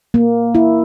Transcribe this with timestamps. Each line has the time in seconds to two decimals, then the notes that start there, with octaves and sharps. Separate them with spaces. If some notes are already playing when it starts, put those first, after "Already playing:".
0.14 A#3
0.55 E4